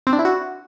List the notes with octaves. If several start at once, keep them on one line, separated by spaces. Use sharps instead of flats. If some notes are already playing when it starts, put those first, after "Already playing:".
C4
D4
E4
F#4